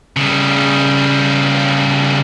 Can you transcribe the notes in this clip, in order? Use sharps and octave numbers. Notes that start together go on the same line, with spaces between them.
C#3 G3